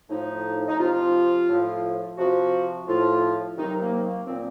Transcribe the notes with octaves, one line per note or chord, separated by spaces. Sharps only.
A2 F3 D#4
D#4
C3 F3 F4
A2 F3
C3 F3 F#4
A2 F3 F4
C3 D#3 F#3 D#4
A#3
A#3
A#2 F3 C4